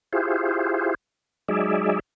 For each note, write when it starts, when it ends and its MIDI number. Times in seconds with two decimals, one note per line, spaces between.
0.13 0.94 64
0.13 0.94 65
0.13 0.94 67
0.13 0.94 68
0.13 0.94 72
1.48 2.00 54
1.48 2.00 56
1.48 2.00 63
1.48 2.00 68
1.48 2.00 74
1.48 2.00 76